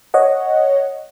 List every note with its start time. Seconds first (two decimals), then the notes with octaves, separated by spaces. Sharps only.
0.14 C#5 D#5 F#5